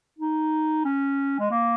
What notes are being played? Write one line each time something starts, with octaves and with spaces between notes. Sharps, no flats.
D#4
C#4
G#3
A#3